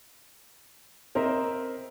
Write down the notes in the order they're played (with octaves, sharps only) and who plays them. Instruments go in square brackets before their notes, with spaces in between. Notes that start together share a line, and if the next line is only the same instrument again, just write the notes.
[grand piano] C4 A#4 C5 D#5 E5